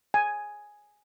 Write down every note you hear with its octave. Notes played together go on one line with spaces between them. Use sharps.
G#5